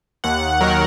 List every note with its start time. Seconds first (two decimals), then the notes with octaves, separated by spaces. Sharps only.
0.24 D#2 F#5
0.61 D#3 F#3 A#4